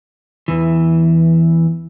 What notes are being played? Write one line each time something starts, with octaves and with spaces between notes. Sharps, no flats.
E2 E3